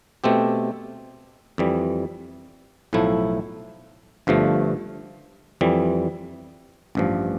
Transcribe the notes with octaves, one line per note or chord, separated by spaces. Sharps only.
B2 A3 C4 G4
F2 E3 G3
B1 A2 F3 A3 E4
G1 G2 F3 A3
F2 E3 G3
A1 G2 F3